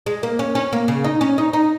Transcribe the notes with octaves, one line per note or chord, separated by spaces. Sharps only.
G#3
A#3
C#4
C#4
A#3
C#3
D#4
C#4
D#4
D#4